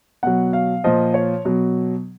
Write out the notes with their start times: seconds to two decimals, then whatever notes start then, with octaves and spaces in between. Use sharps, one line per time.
0.23 B2 F#3 F#5
0.53 F5
0.84 A#2 F3 D#5
1.14 C#5
1.45 B2 F#3